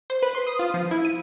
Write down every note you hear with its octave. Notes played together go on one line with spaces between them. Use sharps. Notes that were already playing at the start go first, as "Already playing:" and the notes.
C5
B4
C6
D#6
F4
F3
E4
D#7